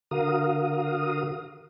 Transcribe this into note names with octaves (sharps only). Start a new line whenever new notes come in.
D3 F#4 A#4 F5 D#6